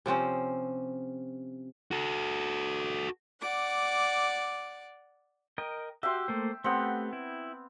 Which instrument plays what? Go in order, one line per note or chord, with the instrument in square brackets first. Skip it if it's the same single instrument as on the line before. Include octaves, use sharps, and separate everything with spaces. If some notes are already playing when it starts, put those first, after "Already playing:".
[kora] C3 F3 C4 C#4
[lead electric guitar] F#4 A4
[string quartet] D5 F#5 D6
[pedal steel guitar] A#4 D#5 G5
[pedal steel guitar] F#4 G4 [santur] E5 G5 C6
[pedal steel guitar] A3 A#3 C5
[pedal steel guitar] A3 G4 F#5 [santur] B3 C4
[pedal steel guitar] E4